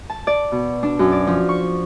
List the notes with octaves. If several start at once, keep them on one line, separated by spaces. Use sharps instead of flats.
A5
D5
B2
D4
F#2
D5
F3
C#6